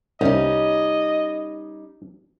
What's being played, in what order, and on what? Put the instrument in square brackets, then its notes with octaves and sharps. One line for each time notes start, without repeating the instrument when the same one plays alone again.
[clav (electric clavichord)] C2 [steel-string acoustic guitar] G3 D#4 [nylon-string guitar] C#4 [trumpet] D#5